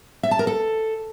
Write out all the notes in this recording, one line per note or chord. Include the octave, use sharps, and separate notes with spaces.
E5
A5
A#4
A4